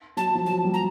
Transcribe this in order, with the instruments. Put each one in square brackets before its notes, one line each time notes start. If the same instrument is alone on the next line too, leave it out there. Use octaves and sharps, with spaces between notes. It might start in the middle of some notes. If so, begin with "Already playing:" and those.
[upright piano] F#3 [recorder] A5
[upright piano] F3
[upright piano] F#3 [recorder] A5
[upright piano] G3
[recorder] A#5